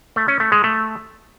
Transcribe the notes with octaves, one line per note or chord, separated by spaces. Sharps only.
A3
C#4
A3
G#3
A3